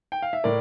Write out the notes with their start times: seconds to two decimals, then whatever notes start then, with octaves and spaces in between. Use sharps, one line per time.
0.12 G5
0.22 F5
0.33 E5
0.44 A2 A#4 D5